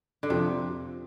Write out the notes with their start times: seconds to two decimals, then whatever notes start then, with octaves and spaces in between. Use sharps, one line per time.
0.23 D3
0.30 F2 C3